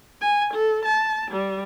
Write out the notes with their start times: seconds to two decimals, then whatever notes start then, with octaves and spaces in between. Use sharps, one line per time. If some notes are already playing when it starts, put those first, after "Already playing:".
0.21 G#5
0.54 A4
0.85 A5
1.31 G3